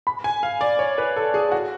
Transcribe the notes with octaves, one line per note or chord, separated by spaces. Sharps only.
B5
G#5
F5
D5
C#5
B4
A4
G#4
F#4